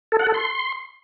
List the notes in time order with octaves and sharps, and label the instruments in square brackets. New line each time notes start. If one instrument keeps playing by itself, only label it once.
[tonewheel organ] A4
F#5
A4
C6